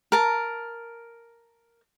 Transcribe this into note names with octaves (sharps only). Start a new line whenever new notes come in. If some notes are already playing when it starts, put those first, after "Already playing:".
A#4 A5